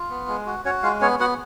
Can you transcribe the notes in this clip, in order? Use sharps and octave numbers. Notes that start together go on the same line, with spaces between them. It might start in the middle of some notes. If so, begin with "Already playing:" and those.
Already playing: F4
B3
G#3
F#4
C#4 F#4 C#5
G#3 F4 F5
B3 C#4 C#5
B3 F#4 F#5